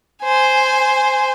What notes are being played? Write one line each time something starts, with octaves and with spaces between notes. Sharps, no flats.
C5 G#5